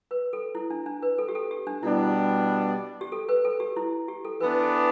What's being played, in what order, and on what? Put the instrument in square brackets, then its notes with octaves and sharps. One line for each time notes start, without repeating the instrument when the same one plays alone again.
[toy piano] B4
A4
E4
D4
D4
B4
A4
G4
A4
G4
D4
[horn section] B2 G3 B3 D4 [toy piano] E4
[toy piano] G4
A4
B4
A4
G4
E4
G4
A4
[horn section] E3 B3 D4 [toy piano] B4
[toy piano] A4